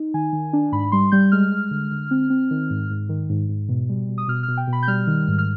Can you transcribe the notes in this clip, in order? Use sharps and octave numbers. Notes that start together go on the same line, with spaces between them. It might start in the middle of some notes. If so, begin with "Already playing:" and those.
Already playing: D#4
D#3 G#5
D#3
D4
G#2 B5
G3 C6
G3 G6
G#3 F6
G#3
D3
D3
C4
C4
D#3
G#2
G#2
D#3
G#2
G#2
B2
G3
B2
D#6
B2 F6
F6
B2
G5
B2
B5
G6
G3 F6
D#3
G#2
F6